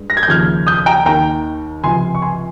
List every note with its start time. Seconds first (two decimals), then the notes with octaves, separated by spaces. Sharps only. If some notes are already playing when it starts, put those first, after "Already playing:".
Already playing: G2 G#3
0.10 A#6
0.17 G#6
0.23 G6
0.28 D#2 C#3 F3 F6 G#6
0.67 D#6 G6
0.86 G5 A#5
1.06 D#2 D#3 A#3 D#4 G5 A#5
1.84 C#2 C3 F3 G#5 C6
2.15 C#6
2.22 G#5 C6